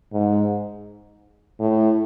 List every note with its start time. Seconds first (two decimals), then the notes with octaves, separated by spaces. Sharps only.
0.13 G#2
1.60 A2